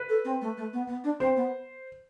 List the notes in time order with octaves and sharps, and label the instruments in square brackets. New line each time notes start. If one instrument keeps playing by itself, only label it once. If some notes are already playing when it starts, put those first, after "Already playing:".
Already playing: [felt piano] B4
[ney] A4
C4
A3
A3
B3
B3
D4
[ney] C4 [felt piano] C5
[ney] B3